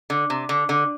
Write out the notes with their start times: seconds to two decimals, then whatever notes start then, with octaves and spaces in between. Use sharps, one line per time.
0.10 D3
0.30 C3
0.49 D3
0.69 D3